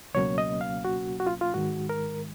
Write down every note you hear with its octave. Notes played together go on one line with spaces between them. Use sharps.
C#2 B2 F#3 A#3 C#4 C#5
D#5
F5
F#4
F#4
F4
F4
G#2 D#3 G#3 F#4
A#4